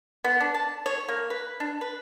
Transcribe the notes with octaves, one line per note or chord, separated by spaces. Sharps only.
B3
D4
A5
C#5
A#3
B4
D4
B4